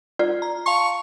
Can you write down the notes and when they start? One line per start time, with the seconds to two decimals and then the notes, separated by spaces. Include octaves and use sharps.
0.19 F4 D5
0.42 A#5
0.66 F5 A5 C6 C#6